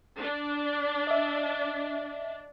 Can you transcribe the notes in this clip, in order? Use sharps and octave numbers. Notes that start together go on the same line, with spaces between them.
D4
D#5 E5